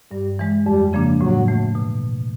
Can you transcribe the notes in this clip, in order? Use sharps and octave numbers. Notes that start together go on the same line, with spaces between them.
G2 G3
E3 G#3
F2 G3
C#3 F3 A#3 D4
A2 F#3
E3 A3
B2